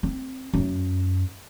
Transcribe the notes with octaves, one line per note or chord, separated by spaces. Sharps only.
C4
F#2